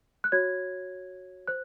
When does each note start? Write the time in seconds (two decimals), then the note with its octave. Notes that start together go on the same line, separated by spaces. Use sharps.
0.24 F#6
0.32 F#4 C#5 G#6
1.48 C5 F#6